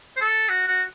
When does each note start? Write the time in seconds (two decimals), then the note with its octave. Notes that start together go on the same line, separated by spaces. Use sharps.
0.16 C5
0.21 A4
0.49 F#4
0.68 F#4